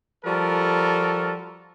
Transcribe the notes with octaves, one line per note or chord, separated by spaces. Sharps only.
F3 G3 F#4 A4 A#4